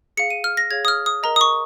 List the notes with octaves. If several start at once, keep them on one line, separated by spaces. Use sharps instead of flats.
G#4 F5 C#7
D#7
F6
A#6
G#4 C#5 F5 G#6
D#6
F6
D#6
A#4 D#5 A#5
D#6
C#6